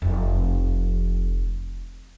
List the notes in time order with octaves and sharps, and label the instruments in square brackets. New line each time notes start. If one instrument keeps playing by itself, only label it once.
[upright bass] F1 F2